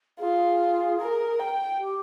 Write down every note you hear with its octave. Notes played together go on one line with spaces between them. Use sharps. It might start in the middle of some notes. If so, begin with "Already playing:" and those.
F4 G#4
A#4
G5
G4